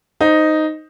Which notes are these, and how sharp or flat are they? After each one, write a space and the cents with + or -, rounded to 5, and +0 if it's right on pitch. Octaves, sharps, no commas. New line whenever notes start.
D#4 +0 C5 +0